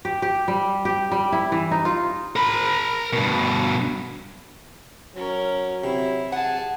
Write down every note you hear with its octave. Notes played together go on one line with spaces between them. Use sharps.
G4
G4
G3
G4
G3
E4
E3
D#4
F4
A#4 B5
G2 B2
F#3 C#4 A#4
C3 E4
G#4 F#5 A5